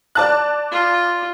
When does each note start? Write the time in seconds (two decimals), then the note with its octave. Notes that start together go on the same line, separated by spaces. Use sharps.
0.15 D5 A5 F#6
0.72 F4